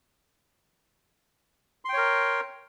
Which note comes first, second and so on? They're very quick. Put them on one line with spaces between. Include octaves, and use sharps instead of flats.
C6 G5 C#5 A#4